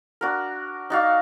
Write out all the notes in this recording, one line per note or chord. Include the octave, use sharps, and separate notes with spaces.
D4 F#4 A#4
D#4 F#4 D5 F5